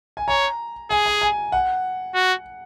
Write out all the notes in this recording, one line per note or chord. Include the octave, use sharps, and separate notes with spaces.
G#5
C#5 A#5
G#4 G#5
G#5
G#5
F#5
F#4